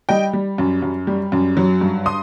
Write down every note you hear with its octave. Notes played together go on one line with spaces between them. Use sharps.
G3 D#5 G5
G3
F#2
F#2
G3
F#2
F#3
G2
C6 D#6